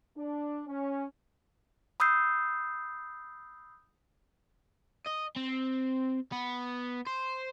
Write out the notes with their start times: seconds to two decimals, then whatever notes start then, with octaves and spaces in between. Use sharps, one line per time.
0.17 D4
0.66 C#4
2.00 B5 D#6 E6 G6 C7
5.06 D#5
5.36 C4
6.32 B3
7.07 C5